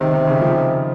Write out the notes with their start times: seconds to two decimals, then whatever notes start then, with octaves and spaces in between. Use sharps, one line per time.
0.01 C3 D#3
0.14 D#3
0.27 C#3
0.41 F3